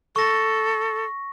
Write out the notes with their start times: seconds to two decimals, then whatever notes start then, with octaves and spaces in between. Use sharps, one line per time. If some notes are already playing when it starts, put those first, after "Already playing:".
0.16 A4 C#6 A#6